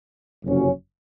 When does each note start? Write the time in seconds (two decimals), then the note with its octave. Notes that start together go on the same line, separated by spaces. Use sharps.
0.44 F#1 F2 C3 F#3 C#4